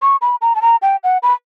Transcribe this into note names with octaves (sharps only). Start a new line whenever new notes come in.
C#6
B5
A#5
A5
A#5
G5
F#5
B5